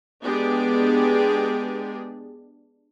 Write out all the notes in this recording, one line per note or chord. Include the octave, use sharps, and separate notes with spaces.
G#3 B3 D4 G4 G#4